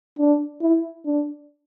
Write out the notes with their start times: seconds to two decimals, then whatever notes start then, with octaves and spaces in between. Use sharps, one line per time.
0.19 D4
0.62 E4
1.06 D4